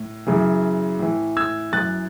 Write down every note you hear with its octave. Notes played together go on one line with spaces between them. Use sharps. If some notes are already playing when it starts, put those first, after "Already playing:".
Already playing: A2
F#2 C#3 E3
A2 E3
E6 G#6
F#2 E3 F#6 A6